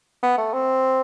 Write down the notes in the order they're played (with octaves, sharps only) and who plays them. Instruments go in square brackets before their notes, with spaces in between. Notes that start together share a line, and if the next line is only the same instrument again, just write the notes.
[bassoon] B3
A3
C4